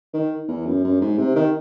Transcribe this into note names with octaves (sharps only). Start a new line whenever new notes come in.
D#3
E2
F#2
F#2
G#2
C3
D#3